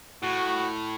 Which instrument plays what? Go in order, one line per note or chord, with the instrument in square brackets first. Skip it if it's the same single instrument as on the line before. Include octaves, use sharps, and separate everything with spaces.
[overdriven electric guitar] A2 [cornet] F#4